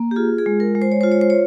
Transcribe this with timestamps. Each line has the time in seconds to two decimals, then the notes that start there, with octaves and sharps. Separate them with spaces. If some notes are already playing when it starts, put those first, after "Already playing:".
Already playing: A#3
0.11 G4
0.16 F4 G#4
0.38 G#4
0.46 G#3
0.60 A#4
0.75 G#3
0.82 C5
0.92 C#5
1.01 F4 C5
1.12 C#5
1.21 C5
1.30 C#5